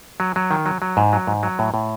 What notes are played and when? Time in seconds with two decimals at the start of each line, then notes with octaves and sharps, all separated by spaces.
0.20 F#3
0.36 F#3
0.51 D#3
0.66 F#3
0.82 F#3
0.97 G#2
1.13 F#3
1.27 G#2
1.43 F#3
1.59 A2
1.74 A2